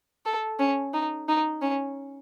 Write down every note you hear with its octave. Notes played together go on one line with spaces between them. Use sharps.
A4
C#4
D#4
D#4
C#4